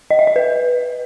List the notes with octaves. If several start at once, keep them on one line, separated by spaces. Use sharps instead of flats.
D#5
E5
D#5
B4